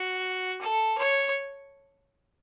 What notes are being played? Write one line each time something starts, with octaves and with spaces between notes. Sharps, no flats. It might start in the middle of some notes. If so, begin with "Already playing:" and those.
Already playing: F#4
A4
C#5